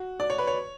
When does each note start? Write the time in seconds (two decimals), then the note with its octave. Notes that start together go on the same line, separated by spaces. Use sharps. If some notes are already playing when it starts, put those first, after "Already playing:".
Already playing: F#4
0.20 D5
0.30 C#5
0.38 B4
0.47 C#5